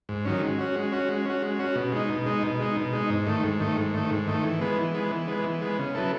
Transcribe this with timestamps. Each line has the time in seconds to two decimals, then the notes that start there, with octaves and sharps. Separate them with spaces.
0.09 G#2
0.25 D#3 F#3 C#4
0.42 G#3
0.59 C#4 F#4
0.76 G#3
0.92 C#4 F#4
1.09 G#3
1.26 C#4 F#4
1.42 G#3
1.59 C#4 F#4
1.76 B2
1.92 G#3 D#4
2.09 B2
2.26 G#3 D#4
2.43 B2
2.60 G#3 D#4
2.77 B2
2.93 G#3 D#4
3.10 G#2
3.27 D#3 A3
3.44 G#2
3.60 D#3 A3
3.77 G#2
3.94 D#3 A3
4.11 G#2
4.27 D#3 A3
4.44 E3
4.61 G#3 B3
4.78 E3
4.94 G#3 B3
5.11 E3
5.28 G#3 B3
5.44 E3
5.61 G#3 B3
5.79 C#3
5.95 F#3 B3 E4 A4